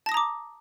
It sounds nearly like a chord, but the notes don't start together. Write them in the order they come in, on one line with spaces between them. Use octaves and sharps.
A5 A#6 D#6 A#5 D6